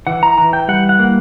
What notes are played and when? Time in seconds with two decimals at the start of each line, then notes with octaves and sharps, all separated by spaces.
0.07 E3 F#5
0.23 A#5
0.38 E3 A#5
0.53 G5
0.68 G3 F#5
0.89 F#5
0.99 A#3